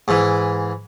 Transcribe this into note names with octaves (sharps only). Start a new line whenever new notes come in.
G#2 E3